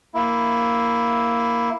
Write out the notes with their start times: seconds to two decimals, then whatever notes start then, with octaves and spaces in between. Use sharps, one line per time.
0.14 A#3 E4